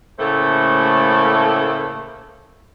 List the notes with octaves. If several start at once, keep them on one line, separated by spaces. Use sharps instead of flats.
A2 C#3 A3 A#3 A4 C5